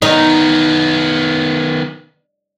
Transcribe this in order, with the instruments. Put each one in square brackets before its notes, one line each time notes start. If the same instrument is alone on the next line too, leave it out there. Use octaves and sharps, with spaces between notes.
[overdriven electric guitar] D#3 B3 [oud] D#4